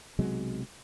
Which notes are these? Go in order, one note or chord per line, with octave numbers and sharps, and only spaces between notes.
B1 C3 F#3 G#3